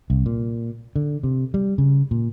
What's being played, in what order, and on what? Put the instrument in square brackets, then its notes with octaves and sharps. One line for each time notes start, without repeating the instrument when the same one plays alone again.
[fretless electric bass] C2
A#2
D3
C3
G3
C#3
A#2